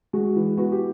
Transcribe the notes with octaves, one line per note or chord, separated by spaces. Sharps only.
G#3 F#4
E3
B3 F#4
G4